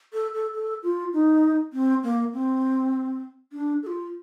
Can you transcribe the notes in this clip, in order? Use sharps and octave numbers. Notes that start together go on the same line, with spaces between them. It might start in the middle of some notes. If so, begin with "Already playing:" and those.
A4
A4
A4
F4
D#4
C4
A#3
C4
D4
A4
F4